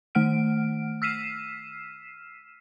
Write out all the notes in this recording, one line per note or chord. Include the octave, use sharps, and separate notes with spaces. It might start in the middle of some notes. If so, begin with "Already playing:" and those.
D#3 A3 F#5 F6 D7
E6 F6 B6 C7 D#7 E7